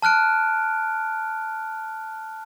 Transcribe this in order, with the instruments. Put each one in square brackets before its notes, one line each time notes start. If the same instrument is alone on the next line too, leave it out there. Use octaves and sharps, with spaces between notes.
[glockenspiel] A5 F6 F#6 D7